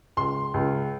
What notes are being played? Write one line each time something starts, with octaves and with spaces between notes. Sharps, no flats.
C#2 C6
C#2